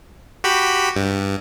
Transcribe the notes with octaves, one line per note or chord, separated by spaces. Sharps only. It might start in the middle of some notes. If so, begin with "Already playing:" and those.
F#4 G4 B5
G2